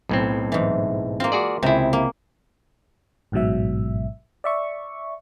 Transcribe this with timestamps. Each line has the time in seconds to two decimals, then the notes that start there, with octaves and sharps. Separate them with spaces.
0.09 B1 A2 C4
0.52 G#2 E3
1.20 A#3 C4 F4
1.32 F#4 G#4 D5
1.63 C#2 C3 E4 G#4
1.93 A#3
3.32 A1 G#2 B2 F#3 E5
4.44 D5 E5 C#6